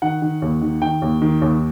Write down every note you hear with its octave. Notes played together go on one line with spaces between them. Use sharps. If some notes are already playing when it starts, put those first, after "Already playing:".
D#3 F#5
D#3
D#2
D#3
D#3 G5
D#2
D#3
D#2